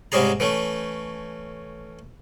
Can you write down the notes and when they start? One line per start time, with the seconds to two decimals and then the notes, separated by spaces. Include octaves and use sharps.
0.12 G#2 C3 G3 C#4 G#4 A#5
0.40 E3 A3 C#4